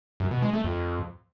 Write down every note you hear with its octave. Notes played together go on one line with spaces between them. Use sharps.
F#2
B2
G#3
A3
F2